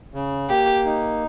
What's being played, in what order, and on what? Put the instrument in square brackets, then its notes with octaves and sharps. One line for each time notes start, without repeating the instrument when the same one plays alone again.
[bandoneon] C#3
[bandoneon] A#3 [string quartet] G4
[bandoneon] D#4